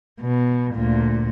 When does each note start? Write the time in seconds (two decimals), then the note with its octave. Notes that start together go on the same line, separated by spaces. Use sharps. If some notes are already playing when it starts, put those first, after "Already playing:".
0.21 B2
0.75 D2 A#2